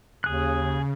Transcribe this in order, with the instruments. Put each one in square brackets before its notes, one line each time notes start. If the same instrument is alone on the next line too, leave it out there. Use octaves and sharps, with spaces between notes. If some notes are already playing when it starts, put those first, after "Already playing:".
[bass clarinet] D#2 [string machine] C#3 [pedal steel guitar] G#4 F#6